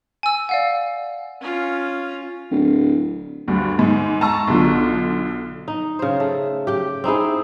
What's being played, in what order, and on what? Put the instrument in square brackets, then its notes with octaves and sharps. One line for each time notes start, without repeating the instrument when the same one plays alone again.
[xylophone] G#5 E6
D5 F5 F#5
[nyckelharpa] C#4 F4
[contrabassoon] D1
[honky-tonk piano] D2 G2
G#2
A5 A#5 C#6 E6
B1 D3 F4
[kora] D#4
C#3 C5
A3
G4 G5
C4 D#4 E4 G#4